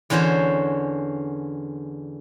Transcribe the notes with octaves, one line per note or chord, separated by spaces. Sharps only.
E2 D3 C#4 F#4 C5